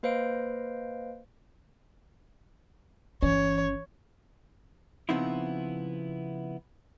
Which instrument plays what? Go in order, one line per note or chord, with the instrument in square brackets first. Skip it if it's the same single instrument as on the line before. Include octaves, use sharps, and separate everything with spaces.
[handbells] A#3 B4 C5 D#5 F5 D7
[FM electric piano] G1 C#4 [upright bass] E3 [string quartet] C#5
[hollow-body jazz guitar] C#3 F3 B3 C4 D#4 E4